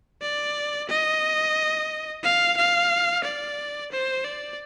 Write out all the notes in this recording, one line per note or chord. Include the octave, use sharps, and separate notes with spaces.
D5
D#5
F5
F5
D5
C5
D5